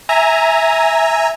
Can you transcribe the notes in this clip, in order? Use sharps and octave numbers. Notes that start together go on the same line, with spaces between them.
E5 G#5 A#5